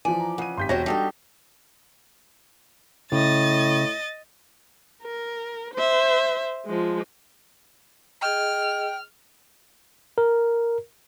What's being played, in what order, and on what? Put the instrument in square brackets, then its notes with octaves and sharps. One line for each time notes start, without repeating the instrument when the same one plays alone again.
[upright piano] E3 F3 [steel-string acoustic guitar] D5 [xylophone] G#5
[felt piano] A#5
[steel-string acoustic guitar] C#3 [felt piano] F#5 D#7
[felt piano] G#1 G4 [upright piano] C6 G6 B6
[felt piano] E1 C#5 [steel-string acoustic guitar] F#4 G4 C5 [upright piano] A#6
[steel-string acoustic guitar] G3 D#4 G4 [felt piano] D4 F#4 A4
[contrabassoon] A2 [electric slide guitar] C#3 [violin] D#5 A6
[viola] A#4
C5 E5
F3 G#3
[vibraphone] G#4 D#5 [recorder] G5 [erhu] F6
[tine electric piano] A#4